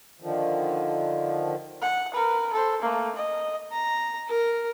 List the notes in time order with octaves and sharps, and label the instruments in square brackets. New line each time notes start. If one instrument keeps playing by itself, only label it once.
[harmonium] D3 D#3 F3
[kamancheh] F#5
A#4 B4
A4 C5
A3 A#3
D#5
[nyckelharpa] A#5
A#4